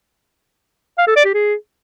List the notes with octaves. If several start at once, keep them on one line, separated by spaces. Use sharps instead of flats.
F5
A4
D5
G4
G#4